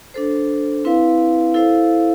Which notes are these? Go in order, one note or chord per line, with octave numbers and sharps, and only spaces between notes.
D4 A4 C5
C4 E4 B4 F5
E4 A4 C5 F5